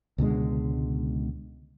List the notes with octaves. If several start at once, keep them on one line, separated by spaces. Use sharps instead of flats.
C#2 B2 D3 G#3